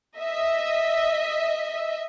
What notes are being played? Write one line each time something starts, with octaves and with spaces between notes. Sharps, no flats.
D#5 E5